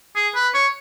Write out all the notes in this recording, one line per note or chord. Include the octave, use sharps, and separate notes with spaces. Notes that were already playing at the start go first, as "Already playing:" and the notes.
G#4
B4
C#5